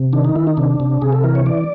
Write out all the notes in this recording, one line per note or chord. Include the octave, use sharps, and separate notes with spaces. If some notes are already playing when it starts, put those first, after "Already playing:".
Already playing: C3
D#3 D4
D#4
D#3 E4
D#4
C3 D4
C3
C3 G#4
A4
E3 A#4
C#5
E3 D5